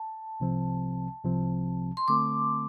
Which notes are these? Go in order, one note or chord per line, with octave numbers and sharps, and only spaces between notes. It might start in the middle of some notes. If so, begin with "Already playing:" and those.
Already playing: A5
C2 C3 F3 C4
C2 C3 F3 C4
C6
D3 A3 C4 D6